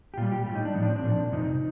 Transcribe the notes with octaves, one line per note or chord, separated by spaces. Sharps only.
G4
A#2 G3 F4
G4
A2 G3 G4
D#4
D4
A2 F3 D#4
D4
C4
D4
A#2 F3
F2 C3 F3 D#4